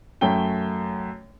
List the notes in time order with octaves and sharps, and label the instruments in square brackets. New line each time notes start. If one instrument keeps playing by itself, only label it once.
[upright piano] F#2 A3 C#4 G5 G7